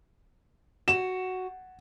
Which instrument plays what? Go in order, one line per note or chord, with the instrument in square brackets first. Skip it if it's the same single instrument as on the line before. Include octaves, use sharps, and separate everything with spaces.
[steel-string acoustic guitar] F#4 [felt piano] E7